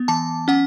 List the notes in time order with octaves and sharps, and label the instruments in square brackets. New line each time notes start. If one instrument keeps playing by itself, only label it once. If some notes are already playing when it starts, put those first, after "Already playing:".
Already playing: [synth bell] B3
E3 A5
C#4 F#5